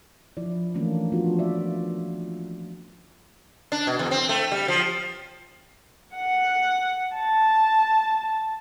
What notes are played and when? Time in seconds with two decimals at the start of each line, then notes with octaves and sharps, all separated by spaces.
0.37 F3 E4 D5
0.74 D#3 E3 A3 A#3 C#4 D4
1.12 F3 B3 D4 F4 F#4
1.38 A#3 D5 E5
3.72 D4
3.87 B2
3.99 E2
4.11 C4
4.29 A3
4.52 G3
4.68 F3
6.15 F#5
7.16 A5